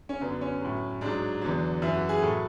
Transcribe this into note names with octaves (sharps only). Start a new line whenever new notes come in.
C#4
F#2 D3 F#3 B3
C#4
A2 F#3
G#2 F#3 D4
E2 D3 F#3
F#2 E3 E4
F#4
G#4
A2 F#3 A4